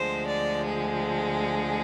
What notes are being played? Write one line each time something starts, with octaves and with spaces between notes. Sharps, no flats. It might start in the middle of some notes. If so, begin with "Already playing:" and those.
Already playing: D2 D3 F3 G#3 C5
D5
G#4